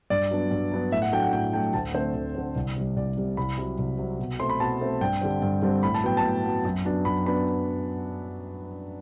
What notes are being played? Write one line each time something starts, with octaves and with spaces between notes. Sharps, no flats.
G2 D5
F#3 B3 D4
G2
F#3 B3 D4
A2 E5
F#5
F#3 A3 D4 G5
F#5
A2 G5
F#3 A3 D4 G5
D2 A5
D3 A3 C4 C5
D2
D3 A3 C4
C2
C3 G3
C2 D5
C3 G3
C2 B5
C3 F#3
C2
C3 F#3
B2
A3 C4 C6
B5
B2 A5
A3 C4
G2 G5
D3 G3 C4
G2
D3 G3 C4
A2 B5
A5
F#3 B3 G5
A5
A2
F#3 B3
F#2
F#3 B3 D4
F#2 B5
F#3 B3 D4 B5